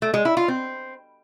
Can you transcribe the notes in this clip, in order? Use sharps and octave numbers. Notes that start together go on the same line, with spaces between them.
A3
G#3
E4
F4
C4